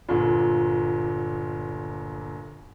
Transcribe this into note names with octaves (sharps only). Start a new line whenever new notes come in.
G1 A#2